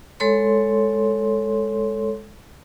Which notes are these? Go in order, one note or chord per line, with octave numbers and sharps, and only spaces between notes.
G#3 A4 C#5 C6